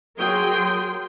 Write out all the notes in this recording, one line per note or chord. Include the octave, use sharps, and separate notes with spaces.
F#3 G#4 A#4 G5 C6